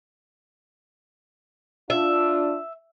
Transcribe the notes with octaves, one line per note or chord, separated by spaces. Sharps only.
D4 F4 E5